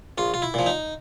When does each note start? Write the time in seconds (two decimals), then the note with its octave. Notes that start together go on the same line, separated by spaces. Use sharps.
0.18 A#1 F4
0.34 F4
0.42 E4
0.54 A#2 F3
0.66 D#4